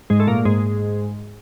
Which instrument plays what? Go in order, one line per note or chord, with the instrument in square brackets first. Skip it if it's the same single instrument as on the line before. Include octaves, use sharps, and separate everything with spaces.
[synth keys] G#2 G#3
A3
A#2 A#3
G#2 G#3